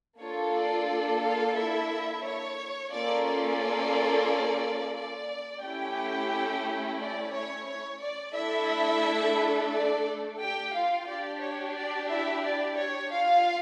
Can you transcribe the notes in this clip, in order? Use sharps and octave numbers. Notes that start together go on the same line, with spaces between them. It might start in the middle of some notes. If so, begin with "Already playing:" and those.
A#3 D4 F4 A4 C#5
D5
D5
F4 F5
E4 E5
C#5
A#3 C#4 F4 A4 D5
D5
D5
A3 C#4 E4 G4 G5
D5
C#5
C#5
D5
A3 D4 E4 A4 E5
D5
G4 G5
F4 F5
D4 G4 D5
C#5
D5
E4 E5
D5
C#5
F4 F5